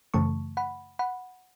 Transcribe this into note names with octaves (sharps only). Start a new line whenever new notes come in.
F#2 C#3 E3 A3 A5 C#6
F#5 B5
F#5 B5